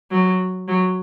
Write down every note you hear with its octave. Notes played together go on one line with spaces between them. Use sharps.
F#3
F#3